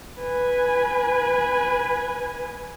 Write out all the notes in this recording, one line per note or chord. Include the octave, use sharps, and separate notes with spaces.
B4 G#5